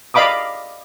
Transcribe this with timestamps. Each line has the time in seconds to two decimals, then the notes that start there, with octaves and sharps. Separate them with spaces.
0.14 D5 D#5 F5 B5 D6 D#6